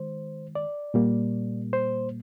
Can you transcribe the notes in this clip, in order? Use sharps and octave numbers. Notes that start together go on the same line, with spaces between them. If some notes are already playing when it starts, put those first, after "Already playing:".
Already playing: D#3 G#3 C5
D5
A#2 G3 A#3
C5